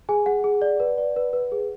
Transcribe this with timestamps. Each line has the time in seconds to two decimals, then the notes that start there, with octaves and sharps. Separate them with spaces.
0.09 G#4 G#5
0.26 G#4 F#5
0.44 G#4
0.62 D5
0.80 B4
0.98 D5
1.16 B4
1.33 B4
1.52 G#4